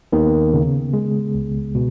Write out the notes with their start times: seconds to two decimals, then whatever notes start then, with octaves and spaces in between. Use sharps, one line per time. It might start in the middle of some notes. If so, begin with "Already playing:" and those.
0.13 D#2 D#3 B3
0.54 C#3
0.93 G#3
1.35 C#2
1.75 B2